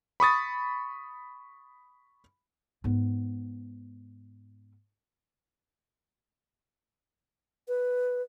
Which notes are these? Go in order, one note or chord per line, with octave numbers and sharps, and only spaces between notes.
B5 C#6 D#6 A6
G#2 B3
B4